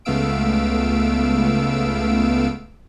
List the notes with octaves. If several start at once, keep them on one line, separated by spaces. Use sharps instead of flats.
C#2 A3 B3 F5 E6 D7